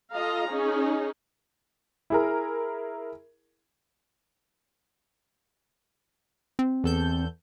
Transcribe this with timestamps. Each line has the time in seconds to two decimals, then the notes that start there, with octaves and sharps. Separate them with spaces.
0.13 F4 A4 D#5 F5 A#5
0.46 C#4 D#4 G#4
2.10 E4 G#4 A#4
6.59 C4
6.84 E2 A4 G6